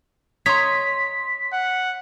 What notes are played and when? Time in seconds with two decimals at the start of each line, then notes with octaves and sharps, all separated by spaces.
0.46 C#5 D#5 A#5 C6 B6
1.53 F#5